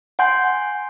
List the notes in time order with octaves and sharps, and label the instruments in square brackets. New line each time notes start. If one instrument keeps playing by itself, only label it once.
[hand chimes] F#5 G#5 C6 G6